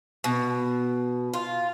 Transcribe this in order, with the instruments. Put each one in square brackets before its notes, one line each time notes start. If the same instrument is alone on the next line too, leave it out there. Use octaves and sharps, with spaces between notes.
[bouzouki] B2
F4